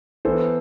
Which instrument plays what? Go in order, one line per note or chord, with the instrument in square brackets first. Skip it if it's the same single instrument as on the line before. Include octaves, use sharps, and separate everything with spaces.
[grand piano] E3 B3 A4 C5